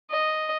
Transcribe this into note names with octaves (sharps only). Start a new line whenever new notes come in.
D#5